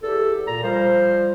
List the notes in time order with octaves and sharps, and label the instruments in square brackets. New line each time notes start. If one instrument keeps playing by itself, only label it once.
[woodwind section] E2 G4 [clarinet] A4
[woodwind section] A#2 [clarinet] A#5
[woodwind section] F3 G3 [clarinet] C5